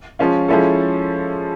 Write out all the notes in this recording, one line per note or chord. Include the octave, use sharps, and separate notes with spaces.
F3 G#3 C#4 F4
F3 G#3 C#4 E4 A4